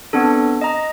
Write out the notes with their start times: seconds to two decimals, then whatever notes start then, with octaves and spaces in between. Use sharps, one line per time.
0.13 B3 C4 D4 A4
0.61 D#5 A#5